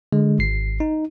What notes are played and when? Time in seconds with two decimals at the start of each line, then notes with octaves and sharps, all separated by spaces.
0.12 D3 G#3
0.39 G#1 C7
0.80 D#4